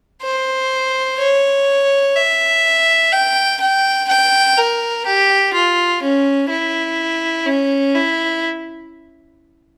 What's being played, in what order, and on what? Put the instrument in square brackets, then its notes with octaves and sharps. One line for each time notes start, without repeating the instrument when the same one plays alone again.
[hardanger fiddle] C5
C#5
E5
G5
G5
G5
A#4
G4
F4
C#4
E4
C#4
E4